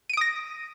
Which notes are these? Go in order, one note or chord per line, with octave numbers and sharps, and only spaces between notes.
D#6 A#6 D7 D#7